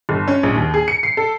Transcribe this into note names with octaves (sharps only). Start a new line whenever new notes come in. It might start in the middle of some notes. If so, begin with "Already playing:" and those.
G1
C#4
A#1
D#2
G#4
C#7
C7
A4